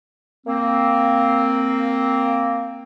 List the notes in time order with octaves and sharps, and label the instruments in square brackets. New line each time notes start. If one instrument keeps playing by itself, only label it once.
[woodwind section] A#3 C4